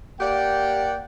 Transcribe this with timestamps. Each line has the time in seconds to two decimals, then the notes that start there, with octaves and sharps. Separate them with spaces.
0.21 A#3 G4 D5 F#5 G5